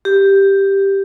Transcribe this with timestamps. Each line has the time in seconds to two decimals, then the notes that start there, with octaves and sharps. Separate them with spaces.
0.05 G4